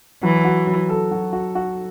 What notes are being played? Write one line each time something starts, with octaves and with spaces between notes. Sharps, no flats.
E3 F#3
F#4
F#3
A4
F#3
F#4
F#4